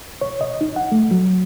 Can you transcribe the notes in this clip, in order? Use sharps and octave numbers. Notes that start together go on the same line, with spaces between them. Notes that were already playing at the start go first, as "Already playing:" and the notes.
C#5
D#5
D#4
F#5
A3
F#3